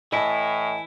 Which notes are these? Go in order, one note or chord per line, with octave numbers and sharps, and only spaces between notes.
A2 E3 E4 D#5 G#5 A5